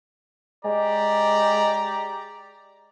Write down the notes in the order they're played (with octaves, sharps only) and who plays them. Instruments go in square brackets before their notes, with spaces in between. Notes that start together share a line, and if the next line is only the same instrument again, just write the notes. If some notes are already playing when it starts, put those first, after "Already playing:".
[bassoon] G#3 [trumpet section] G4 D5 A#5